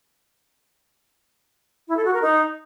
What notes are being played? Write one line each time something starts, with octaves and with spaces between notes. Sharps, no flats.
E4
A4
F#4
A#4
D#4